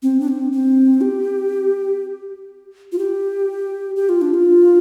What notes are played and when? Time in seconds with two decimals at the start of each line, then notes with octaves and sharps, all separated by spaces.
0.03 C4
0.21 D4
0.28 C4
0.52 C4
1.01 G4
2.92 F4
2.98 G4
3.96 G4
4.09 F4
4.22 D4
4.34 F4